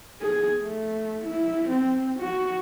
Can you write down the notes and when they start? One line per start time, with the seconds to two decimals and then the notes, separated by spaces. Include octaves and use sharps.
0.22 G#4
0.62 A3
1.26 E4
1.69 C4
2.20 F#4